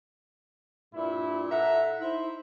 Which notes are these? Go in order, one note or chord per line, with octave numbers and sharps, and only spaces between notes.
G2 A#2 E4
A4 E5 F#5 A#5
D#4 E4 C5